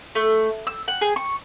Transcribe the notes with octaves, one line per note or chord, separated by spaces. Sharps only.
A3
E6
F#5
G#4
C#6